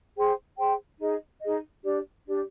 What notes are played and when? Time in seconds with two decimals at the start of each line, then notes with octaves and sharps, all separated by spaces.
0.16 G#4 C5 G5 C6
0.57 G#4 C5 G5 C6
0.99 D#4 G#4 D#5
1.41 D#4 G#4 D#5
1.83 D4 G4 D5
2.25 D4 G4 D5